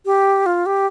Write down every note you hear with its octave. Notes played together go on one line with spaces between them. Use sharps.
G4
F4
G4